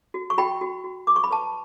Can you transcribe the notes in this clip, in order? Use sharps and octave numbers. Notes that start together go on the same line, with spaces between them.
F#4
C#6
F#4 G5 B5
F#4
F#4
B4 D6
C#6
B5
B4 A5 C#6